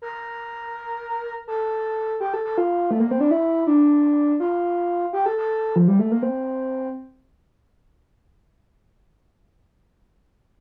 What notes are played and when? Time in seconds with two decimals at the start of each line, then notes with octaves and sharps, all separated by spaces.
0.02 A#4
1.48 A4
2.20 G4
2.34 A4
2.45 A4
2.58 F4
2.91 A3
3.00 A#3
3.11 C4
3.20 D4
3.31 E4
3.67 D4
4.40 F4
5.13 G4
5.26 A4
5.38 A4
5.76 F3
5.88 G3
5.99 A3
6.12 A#3
6.22 C4